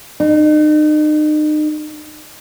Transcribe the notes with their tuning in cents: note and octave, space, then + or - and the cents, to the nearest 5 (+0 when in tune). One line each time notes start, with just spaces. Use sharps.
D#4 -40